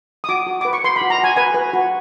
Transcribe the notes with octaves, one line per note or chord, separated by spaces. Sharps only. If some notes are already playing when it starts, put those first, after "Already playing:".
D#6
F#4 D6
F#4
B4 D6
C#6
B4 C6
B5
F#4
A#5
F#4
G#5
B4 G#5
B4
F#4